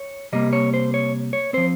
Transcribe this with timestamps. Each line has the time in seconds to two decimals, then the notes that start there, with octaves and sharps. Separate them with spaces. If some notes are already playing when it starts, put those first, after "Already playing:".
Already playing: C#5
0.32 C3 G3 A#3 D#5
0.53 C#5
0.74 C5
0.94 C#5
1.33 C#5
1.53 F3 C4 C5